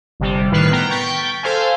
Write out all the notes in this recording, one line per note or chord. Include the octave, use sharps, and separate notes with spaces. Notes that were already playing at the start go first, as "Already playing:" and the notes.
G1 C3 G3
A2 D#3 B4 F6 C7
B3 G5 A#5
G5 C#6 G6 A6 B6
A4 C5 F5 G#5